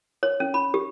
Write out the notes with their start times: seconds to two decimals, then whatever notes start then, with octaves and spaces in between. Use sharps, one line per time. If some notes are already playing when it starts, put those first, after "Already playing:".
0.23 C#5
0.40 C#4
0.54 B5
0.74 G4